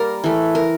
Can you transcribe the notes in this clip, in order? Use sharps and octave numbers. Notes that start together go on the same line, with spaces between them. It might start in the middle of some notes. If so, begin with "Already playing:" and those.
Already playing: G3 A#3 A#4 D5
E3 A3
A#4